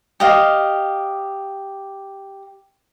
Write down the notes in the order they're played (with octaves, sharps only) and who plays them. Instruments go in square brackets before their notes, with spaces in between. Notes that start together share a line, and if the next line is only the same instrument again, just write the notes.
[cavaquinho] G4 D#5 F5